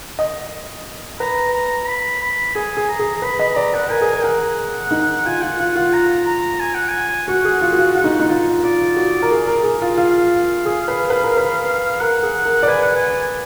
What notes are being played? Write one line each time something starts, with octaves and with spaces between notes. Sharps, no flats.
D#5
B4 A#5
A#5
B5
B5
G#4 G#5
G#4
A#5
G#4
A#5
B4 B5
D#5 B5
D5 A#5
B4 F#5
A#4 G#5
G#4
A#4
A#4 F#5
D#4
F4 G#5
F4 F#5
F4 F#5
F4 F#5
A#5
A#5
G#5
F#5
G#5
F#4 F#5
G#4
F4 F#5
F#4
F4
F4 F#5
D#4
D#4
F4
F4 D5
F#4
A#4
G#4
A#4
G#4
F4
F4 F5
G#4
B4
B4
A#4
B4
A#4 F#5
G#4
A#4
D5
B4 G#5
F#5
G#5